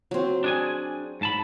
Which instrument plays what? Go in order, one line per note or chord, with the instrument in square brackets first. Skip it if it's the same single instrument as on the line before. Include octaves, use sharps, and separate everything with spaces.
[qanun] F#3 C4
[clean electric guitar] D4 G#4 G#5
G#2 A5 B5